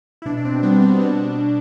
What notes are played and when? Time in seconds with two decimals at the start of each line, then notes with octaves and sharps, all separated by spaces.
0.22 E4
0.25 B2 D4
0.37 D4
0.45 C4
0.63 G3 B3
0.82 C4
1.01 B2 D4